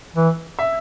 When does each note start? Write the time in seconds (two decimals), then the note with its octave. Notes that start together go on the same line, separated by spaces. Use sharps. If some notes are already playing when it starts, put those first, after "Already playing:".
0.16 E3
0.59 E5